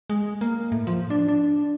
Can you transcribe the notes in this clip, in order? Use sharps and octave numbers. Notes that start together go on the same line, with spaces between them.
G#3
A#3
A2
F3
D4
D4